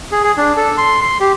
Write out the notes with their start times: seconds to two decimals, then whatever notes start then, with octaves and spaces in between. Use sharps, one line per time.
0.11 G#4
0.24 G#4
0.37 D4
0.57 A4
0.77 C6
1.01 C6
1.20 G4